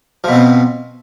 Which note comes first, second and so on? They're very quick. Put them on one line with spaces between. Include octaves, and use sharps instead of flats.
F3 B2 C4 B3